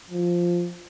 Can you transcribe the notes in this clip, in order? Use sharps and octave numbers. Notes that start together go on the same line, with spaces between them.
F3